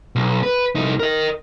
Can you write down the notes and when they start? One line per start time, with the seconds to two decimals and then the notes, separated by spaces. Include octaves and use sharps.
0.16 B1
0.43 B4
0.76 C2 D#4
1.00 A#4 D#5